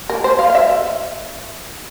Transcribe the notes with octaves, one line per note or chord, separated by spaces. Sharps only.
A#4
C5
F5
F5
E5